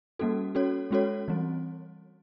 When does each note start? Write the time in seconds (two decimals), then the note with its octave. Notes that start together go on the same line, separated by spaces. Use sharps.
0.19 G3 A#3 C#4 F#4 A4
0.55 C#4 F#4 A4 C#5
0.91 G#3 C#4 F#4 A4 C#5
1.28 E3 G3 C4